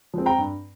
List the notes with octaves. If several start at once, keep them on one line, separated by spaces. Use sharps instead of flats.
F3 G#3 C4
G5 A#5
G2